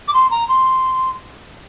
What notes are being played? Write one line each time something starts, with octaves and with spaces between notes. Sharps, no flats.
D6
C6
A#5
C6